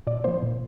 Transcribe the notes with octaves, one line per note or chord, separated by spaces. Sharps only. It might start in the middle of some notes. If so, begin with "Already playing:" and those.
A#2 D5
F3 A#3 C5
A#2